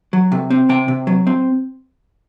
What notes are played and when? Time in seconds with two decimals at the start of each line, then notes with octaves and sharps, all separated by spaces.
0.13 F#3
0.32 C3
0.50 C4
0.69 C3 G5
0.88 C3
1.07 F#3
1.27 C4